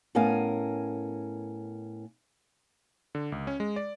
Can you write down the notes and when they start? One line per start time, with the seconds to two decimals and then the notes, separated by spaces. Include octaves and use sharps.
0.15 A2 B3 C#4 A#4 F5 G#5
3.15 D3
3.32 C#2
3.47 C#4
3.60 G#3
3.76 D5